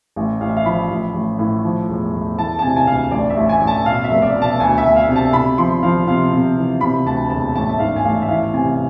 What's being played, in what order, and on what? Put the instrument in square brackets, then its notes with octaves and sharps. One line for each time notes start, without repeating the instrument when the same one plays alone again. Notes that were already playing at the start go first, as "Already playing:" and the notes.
[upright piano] A1
A1 F5
E5
F5
F3 B5
A1
A1
A2
F3
E1
E1
E3 A5
A5
C3 G#5
G#5
D2 F5
A1 D5
E5
A1
G#5
A1
A5
B2 F5
E5
F1
D5
B2
A5
D2 G#5
E5
D2
F5
C3
A5
C3 B5
F3 C6
F3 F5
C3 F5
C3
E3
C3 B5
D2 A5
E1 A5
A1 A5
E5
G#2 F5
G#5
A1 F5
E5
E3 F5
C3 G#5